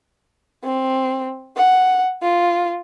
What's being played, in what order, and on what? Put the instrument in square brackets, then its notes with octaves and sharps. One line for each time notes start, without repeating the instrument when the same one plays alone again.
[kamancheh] C4
F#5
F4